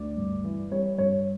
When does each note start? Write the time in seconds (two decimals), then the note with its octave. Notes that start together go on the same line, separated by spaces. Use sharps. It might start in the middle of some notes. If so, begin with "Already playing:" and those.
Already playing: D2 D5
0.17 G2
0.44 E3
0.71 G3 C#5
0.98 G2 C#5